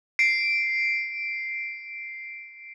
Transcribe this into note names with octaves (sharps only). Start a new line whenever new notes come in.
C7 D7